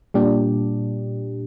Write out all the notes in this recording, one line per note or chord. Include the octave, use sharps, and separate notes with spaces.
A#2 G3 D4 G4